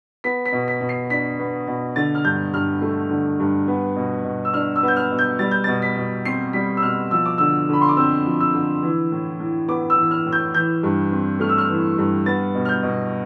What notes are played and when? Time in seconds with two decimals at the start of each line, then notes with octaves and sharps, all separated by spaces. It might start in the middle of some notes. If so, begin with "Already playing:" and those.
0.24 B3 B6
0.45 B6
0.52 B2
0.68 B6
0.81 B2
0.89 C7
1.10 D4 B6
1.39 B3
1.67 B2
1.96 D3 A6
2.15 F6
2.24 G2 G6
2.53 G2 F6
2.82 A3
3.10 D3
3.40 G2
3.68 B3
3.96 B2
4.25 B2
4.45 E6
4.54 D4 F6
4.76 E6
4.83 B3
4.88 G6
4.96 F6
5.11 B2
5.19 G6
5.39 G3 A6
5.51 G6
5.64 B2 A6
5.82 B6
5.97 B2
6.25 C4 C7
6.53 G3 B6
6.77 E6
6.82 B2 F6
7.11 F3 E6
7.25 D6
7.38 D3 E6
7.69 D3 B5
7.81 C6
7.89 D6
7.97 C4 E6
8.26 F3
8.40 E6
8.54 D3
8.83 E3
9.12 A2
9.40 A2
9.68 B3 D6
9.90 E6
9.98 E3
10.11 F6
10.26 A2
10.32 G6
10.54 E3 G6
10.83 G2
11.12 C4
11.40 A3 F6
11.49 E6
11.58 F6
11.69 E3
11.98 G2
12.26 B3 A6
12.55 B2
12.65 F6
12.69 G6
12.83 B2